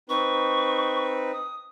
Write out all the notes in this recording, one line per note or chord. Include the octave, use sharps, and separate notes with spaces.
C4 D#4 B4 C#6
D#6